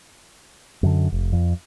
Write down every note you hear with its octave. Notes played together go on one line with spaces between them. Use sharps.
F#2 D3
F1
F2